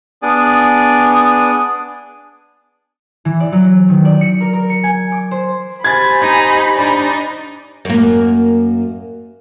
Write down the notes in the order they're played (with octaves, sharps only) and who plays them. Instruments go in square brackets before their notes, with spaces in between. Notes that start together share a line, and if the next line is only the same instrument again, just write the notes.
[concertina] B3 D4 G#4 D5 G#5
[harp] E3
D5
F#3
D#3
D5
C#7
A#4
A#4
C#7
G#5
D6
C5
[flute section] G4 C5 G#5 [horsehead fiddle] B5 [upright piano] G#6 A6
[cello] D#4
D4 D#4
[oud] F#2 A#3